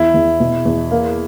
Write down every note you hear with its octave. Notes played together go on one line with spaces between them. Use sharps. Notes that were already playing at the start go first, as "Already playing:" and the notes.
Already playing: E2 E4
E2
B2
E2
A#3